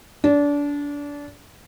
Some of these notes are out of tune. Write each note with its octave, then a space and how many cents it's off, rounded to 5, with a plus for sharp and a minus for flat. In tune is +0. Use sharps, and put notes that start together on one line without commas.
D4 -25